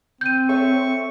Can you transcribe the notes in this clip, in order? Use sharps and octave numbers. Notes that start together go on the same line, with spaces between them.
C4 G6 D#7
A4 C#5 E5 C#6